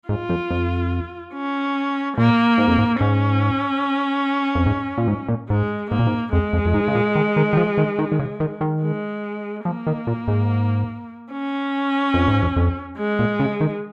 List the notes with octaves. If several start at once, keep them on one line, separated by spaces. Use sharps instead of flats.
G#2 F4
F2
F2
C#4
A#2 A#3
G#2
F2
G#2
G#2 C#4
F2
G#2
A#2
G#2
A#2
G#2 G#3
G#2 A#3
A#2
G#2
F2 G#3
F2
F2
G#2
C#3
A#2
D#3
D#3
D#3
F3
D#3
D#3
D#3
C#3
D#3
D#3
G#3
F3 A#3
D#3
A#2
G#2
C#4
F2
G#2
F2
F2
G#3
A#2
C#3
D#3